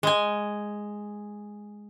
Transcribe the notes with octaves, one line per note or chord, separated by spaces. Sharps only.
G#3 G#5